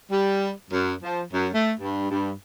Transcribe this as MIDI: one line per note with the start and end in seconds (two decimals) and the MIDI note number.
0.10 0.50 55
0.71 0.91 42
1.03 1.22 53
1.33 1.47 42
1.53 1.72 57
1.79 2.07 43
2.11 2.31 43